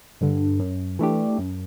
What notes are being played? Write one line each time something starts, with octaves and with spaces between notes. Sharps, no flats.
G2 D3
F#2
E3 A3 D4 G4
F#2